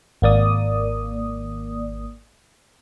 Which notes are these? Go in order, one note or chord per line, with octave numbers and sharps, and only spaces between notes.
G#1 A#3 D5 D#6